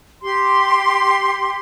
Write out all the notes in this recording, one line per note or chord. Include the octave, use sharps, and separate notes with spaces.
G4 C6